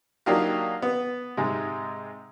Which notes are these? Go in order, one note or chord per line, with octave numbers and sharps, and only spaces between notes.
F#3 A#3 D4 D#4 F4 G4
B3
G#2 C3 G#3